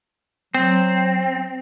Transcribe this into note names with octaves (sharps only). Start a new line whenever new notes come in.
F#3 C4